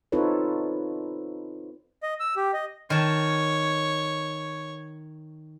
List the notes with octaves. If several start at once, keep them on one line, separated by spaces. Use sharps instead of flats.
C4 D#4 F4 A4 B4 C#5
D#5
E6
G4
D#5
D#3 C#5 A5